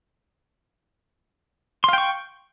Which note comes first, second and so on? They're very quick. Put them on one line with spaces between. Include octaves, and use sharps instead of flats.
C6 F5 G5 C#6